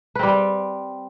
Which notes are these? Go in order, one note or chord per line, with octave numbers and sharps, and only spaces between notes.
G3 C4 B4